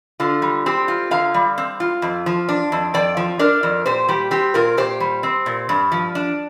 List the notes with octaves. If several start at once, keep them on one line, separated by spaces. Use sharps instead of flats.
D3 F4
G3
C4 G4
F4
D3 F5 A#5
G3
C4
F4
F2
F3
D4
F2
F2 D5 G5
F3
D4 A#4 D5
F2
A#2 G4 C5
G3 G4
C4 G4
A#2 F4 A#4
A#2 G4 C5
G3
C4
A#2
G2
F3
D4